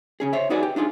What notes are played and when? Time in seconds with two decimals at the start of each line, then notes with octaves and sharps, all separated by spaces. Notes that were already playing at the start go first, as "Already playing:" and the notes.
0.20 C#3 C#4 G#4
0.33 C5 C#5 E5
0.50 D#4 F#4 G#4 B4 D5
0.63 G4
0.76 D4 D#4 F4 G#4